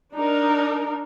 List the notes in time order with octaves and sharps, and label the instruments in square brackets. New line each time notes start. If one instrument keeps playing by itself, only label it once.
[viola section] D4 D#4 A#4